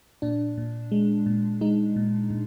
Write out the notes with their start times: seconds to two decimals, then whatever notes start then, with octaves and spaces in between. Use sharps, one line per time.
0.22 A#2 D4
0.58 A#2
0.92 G#3
1.26 A#2
1.61 G#3 D#4
1.96 A#2
2.30 A#2